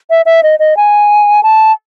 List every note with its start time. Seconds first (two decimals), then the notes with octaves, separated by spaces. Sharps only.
0.10 E5
0.26 E5
0.43 D#5
0.59 D#5
0.77 G#5
1.43 A5